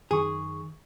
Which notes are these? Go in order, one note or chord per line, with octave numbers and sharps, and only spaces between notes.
F#2 D#3 G#4 C#6